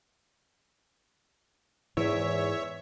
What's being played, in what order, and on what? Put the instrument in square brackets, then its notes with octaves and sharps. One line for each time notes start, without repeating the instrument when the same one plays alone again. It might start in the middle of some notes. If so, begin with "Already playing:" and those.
[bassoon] E2 [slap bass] G#2 [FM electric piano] E3 [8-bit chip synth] C#5 E5